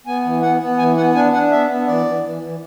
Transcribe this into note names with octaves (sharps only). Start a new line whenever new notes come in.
B3 G#5
E3
B3 F#5
B3
E3 G#5
B3 F#5
D4 G#5
D4 F#5
B3 E5
B3
E3 D5
E3
E3
E3